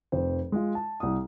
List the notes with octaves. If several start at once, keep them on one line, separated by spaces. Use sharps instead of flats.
F1 F2 C5
G#3 F4
A5
C2 D#6